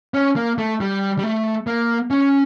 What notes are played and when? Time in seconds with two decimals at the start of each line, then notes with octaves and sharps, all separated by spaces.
0.14 C#4
0.36 A#3
0.58 A3
0.80 G3
1.18 G3
1.24 A3
1.67 A#3
2.11 C#4